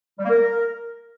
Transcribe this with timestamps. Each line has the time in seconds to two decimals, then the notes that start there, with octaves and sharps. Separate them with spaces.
0.19 G3
0.24 A#3
0.30 A#4